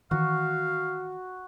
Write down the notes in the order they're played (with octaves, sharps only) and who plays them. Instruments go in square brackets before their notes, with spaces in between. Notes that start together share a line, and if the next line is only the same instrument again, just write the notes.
[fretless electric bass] D#3 E3 [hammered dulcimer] F#4 [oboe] F5